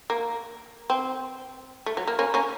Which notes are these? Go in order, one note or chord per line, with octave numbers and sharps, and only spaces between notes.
A#3
C4
A3
F#3
A#3
A#3 C#4
A#3 C#4